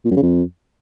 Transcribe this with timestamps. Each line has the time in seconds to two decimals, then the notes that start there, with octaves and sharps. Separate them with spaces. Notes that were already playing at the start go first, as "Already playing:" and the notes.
0.05 A#2
0.11 F#2
0.17 C#3
0.22 F2